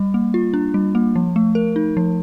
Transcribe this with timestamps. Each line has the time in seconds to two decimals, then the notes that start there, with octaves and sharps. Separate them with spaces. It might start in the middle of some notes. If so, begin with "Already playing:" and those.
Already playing: G3
0.14 A#3
0.34 F4
0.54 D4
0.74 G3
0.95 A#3
1.16 F3
1.36 A3
1.55 A#4
1.76 D#4
1.97 F3